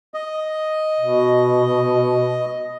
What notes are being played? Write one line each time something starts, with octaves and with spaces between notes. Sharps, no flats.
D#5
B2